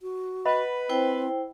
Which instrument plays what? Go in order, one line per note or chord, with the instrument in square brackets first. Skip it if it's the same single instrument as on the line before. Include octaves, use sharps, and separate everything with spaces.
[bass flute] F#4
[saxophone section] B4 [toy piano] D#5 F#5 B5
[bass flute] C4 [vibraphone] E4 C5 G5